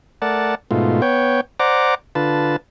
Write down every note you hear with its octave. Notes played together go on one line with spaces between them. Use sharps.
A3 A#4 D5 F#5 A5
G#2 B2 A3 F4
B3 C#5 G5
C5 D5 F#5 A#5 D6
D3 F4 B4 A5